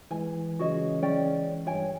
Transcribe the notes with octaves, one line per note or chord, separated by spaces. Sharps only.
E3 G#3 G#5
C#3 F#4 G#4 D#5
C#4 D5 G5
G2 C#5 G5 G#5